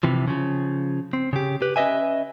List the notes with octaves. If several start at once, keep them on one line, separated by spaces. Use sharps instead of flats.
C3 E3 F3
C#3 F3
C4
C#3 G4
G4 B4
C#4 B4 D#5 E5 G#5